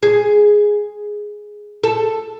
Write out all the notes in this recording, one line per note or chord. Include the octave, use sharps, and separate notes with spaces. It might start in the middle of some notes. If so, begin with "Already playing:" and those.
G#4
A4